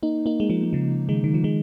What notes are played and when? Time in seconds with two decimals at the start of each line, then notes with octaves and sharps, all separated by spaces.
0.03 A#3 D#4
0.26 A#3 D#4
0.40 G#3
0.50 F3 A#3
0.63 G#3
0.73 C#3 F3
1.09 D#3 G#3
1.24 D#3
1.34 F3
1.44 D#3 G#3